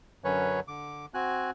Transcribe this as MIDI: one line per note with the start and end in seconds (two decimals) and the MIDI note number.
0.24 0.60 42
0.24 0.60 50
0.24 0.60 54
0.24 0.60 61
0.24 0.60 71
0.24 0.60 73
0.68 1.06 50
0.68 1.06 86
1.14 1.51 60
1.14 1.51 66
1.14 1.51 80
1.14 1.51 90